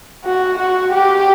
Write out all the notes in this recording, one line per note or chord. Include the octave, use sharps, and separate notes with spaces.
F#4
F#4
G4